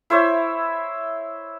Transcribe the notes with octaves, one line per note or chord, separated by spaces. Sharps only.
E4 C5 C#5 E5